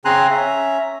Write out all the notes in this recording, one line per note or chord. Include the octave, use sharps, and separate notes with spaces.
C#3 C4 G#5 A#5 C6 F#6
C#4 E5 A#5